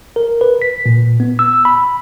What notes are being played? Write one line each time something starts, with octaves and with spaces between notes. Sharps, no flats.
A#4
B4
B6
A#2
B3
E6
B5